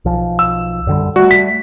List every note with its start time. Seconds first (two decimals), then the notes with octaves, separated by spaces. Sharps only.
0.05 B1 F3
0.39 E6
0.87 F#2 D3 G3
1.16 G3 A3 F#4
1.31 B6